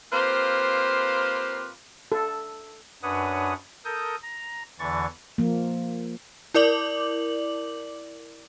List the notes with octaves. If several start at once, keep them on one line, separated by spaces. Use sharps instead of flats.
A#3 C4 F4 G4 B4 C5
A4
F#2 D4 B4 C#5 F#5 D#6
A4 A#4 D#6 G6
A#5
E2 D3 E3 C#6 A6
F3 A#3
E4 A#4 D5 D6 F#7